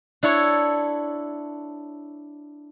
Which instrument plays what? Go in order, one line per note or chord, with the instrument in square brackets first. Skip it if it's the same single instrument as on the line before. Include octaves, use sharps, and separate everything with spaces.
[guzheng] D4 E4 A4 C#5